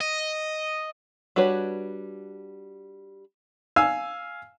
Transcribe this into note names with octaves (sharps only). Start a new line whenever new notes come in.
D#5
G3 D4 F#4 B4 C#5
F5 G#5 E6